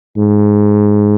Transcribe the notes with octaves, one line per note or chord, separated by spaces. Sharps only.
G#2